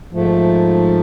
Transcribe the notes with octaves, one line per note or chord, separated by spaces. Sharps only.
G#2 F3 A3